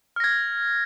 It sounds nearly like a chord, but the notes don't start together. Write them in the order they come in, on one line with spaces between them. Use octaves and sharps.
F6 A#6 G#6